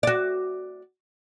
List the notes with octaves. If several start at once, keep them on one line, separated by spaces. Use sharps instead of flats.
F#4 D5